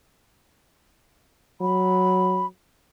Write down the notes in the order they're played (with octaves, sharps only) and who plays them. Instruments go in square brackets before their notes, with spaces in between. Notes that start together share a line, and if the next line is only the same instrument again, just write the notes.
[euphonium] F#3 [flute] B5